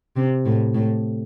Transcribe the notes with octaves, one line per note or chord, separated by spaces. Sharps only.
C3
A2
A2